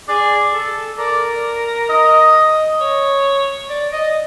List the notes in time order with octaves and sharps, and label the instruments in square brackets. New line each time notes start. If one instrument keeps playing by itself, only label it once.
[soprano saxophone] G#4 [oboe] D5
[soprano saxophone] A4
[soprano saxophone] A#4 [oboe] D5
[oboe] D#5
[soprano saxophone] C#5
D5
D#5